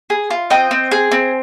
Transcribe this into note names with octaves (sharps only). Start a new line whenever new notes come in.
G#4
F4
C4 D#5 G5
C4
G#4
C4